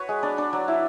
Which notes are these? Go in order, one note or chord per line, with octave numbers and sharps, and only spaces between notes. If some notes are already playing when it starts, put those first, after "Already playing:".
Already playing: F#4 B4 C#5
G#3
D4 D5
D4
F#3
E4